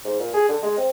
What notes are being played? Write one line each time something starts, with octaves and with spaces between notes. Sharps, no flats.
G#2
A#2
G#4
D3
G#3
C4